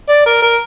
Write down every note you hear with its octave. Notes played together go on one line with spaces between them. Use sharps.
D5
A#4
A#4